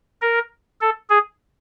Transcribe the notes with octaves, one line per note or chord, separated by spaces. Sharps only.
A#4
A4
G#4